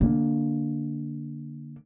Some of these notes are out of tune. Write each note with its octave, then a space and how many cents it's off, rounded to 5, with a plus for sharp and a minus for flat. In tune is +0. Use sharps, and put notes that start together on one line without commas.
D3 +0 A#3 +10